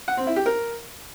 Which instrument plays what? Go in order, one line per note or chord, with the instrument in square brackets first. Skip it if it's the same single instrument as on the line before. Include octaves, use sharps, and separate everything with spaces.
[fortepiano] F#5
C4
E4
G4
A#4